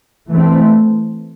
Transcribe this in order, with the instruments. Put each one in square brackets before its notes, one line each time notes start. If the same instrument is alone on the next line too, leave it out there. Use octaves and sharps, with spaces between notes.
[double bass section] E3 A3 C4